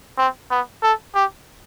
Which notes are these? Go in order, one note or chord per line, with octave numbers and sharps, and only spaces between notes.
C4
B3
A4
G4